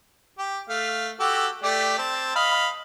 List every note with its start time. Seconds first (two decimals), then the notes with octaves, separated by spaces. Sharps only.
0.39 G4
0.70 A3 F5
1.20 F#4 G4 A4
1.63 A3 G4 D5
1.98 C4 A5
2.36 D#5 F5 B5